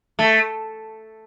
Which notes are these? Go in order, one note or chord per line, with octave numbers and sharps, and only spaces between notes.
A3